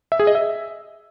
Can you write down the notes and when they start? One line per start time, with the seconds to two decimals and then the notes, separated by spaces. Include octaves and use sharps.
0.12 E5
0.20 G#4
0.27 D#5
0.35 E5